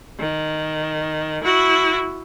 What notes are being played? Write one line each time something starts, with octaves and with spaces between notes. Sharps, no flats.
D#3
E4 F#4